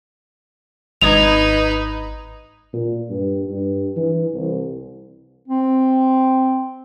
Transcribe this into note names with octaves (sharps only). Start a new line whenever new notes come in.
G#1 D#4 B4 D#5 G#6 F7
A#2
G2
G2
E3
C2
C4